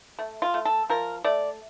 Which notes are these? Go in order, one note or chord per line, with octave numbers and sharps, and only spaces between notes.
A3
F4
A3
A4
F3 A#4
A3 D5